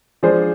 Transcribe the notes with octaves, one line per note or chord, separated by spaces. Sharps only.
F3 G#3 D4 G#4 C5